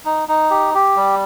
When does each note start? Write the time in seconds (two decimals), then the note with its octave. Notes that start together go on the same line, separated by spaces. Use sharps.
0.05 D#4
0.28 D#4
0.50 G4
0.74 G4
0.96 G3